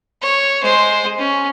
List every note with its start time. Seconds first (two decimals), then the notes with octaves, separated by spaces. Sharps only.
0.22 C#5
0.62 G#3 C5
1.18 C#4